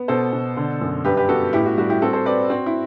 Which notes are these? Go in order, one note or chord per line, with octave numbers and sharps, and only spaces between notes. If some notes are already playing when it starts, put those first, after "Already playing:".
Already playing: B3
B2 A4 C5
B2
D3
F#2
G2 G4 B4
G4 B4
B3 F#4 A4
A2 E4 G4
F#4
G3 F#4
E4 G4
C4 F#4 A4
A4 C5
C4 B4 D5
C4 F#4
E4